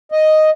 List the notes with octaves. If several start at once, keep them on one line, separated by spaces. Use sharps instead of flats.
D#5